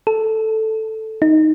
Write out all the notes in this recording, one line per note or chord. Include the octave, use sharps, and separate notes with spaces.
A4
D#4